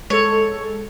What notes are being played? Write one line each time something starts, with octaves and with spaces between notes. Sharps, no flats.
G#3 A4 C#5